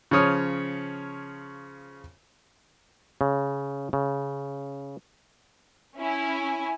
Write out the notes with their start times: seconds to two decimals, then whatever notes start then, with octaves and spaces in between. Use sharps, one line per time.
0.11 C#3 F3 C#5 D#6 F6
3.21 C#3
3.93 C#3
5.97 C#4 E4 G#5